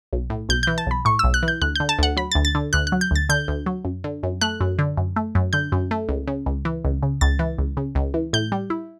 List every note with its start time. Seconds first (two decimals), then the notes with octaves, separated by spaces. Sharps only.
0.13 B1
0.30 A2
0.49 B1 G6
0.63 E3 G6
0.78 A5
0.87 B1 B5
1.05 A2 C#6
1.19 B1 E6
1.34 F#6
1.43 E3
1.48 G6
1.62 D2 F#6
1.76 D3 G6
1.89 A5
1.99 D2 F#5
2.17 F#3 B5
2.32 D2 A6
2.45 A6
2.55 D3
2.73 D2 F#6
2.87 F#6
2.92 F#3
3.01 G6
3.11 D2 A6
3.29 D3 G6
3.48 D2
3.66 F#3
3.85 F#2
4.04 D3
4.23 F#2
4.41 A3 F#6
4.61 F#2
4.79 D3
4.97 F#2
5.16 A3
5.35 F#2
5.53 D3 G6
5.72 F#2
5.91 A3
6.09 C#2
6.27 C#3
6.46 C#2
6.65 E3
6.84 C#2
7.03 C#3
7.21 C#2 A6
7.39 E3
7.58 C#2
7.77 C#3
7.95 C#2
8.14 E3
8.33 A2 G6
8.52 G3
8.70 E4